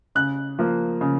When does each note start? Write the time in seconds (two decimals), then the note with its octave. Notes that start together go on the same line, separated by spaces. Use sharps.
0.15 C#3 F#6
0.59 F3 A#3
1.01 C#3